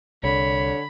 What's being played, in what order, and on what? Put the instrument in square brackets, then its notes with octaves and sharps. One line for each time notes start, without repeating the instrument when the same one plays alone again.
[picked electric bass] C2 [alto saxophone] D3 [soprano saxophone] C#5 [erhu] B5